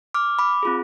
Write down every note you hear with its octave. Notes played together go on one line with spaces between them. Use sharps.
D6 F6
B5 D6
C4 F4 G#4